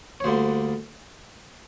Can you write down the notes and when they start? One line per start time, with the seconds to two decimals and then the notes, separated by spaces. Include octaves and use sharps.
0.20 C#5
0.24 D2 D3 G3 A#3 C5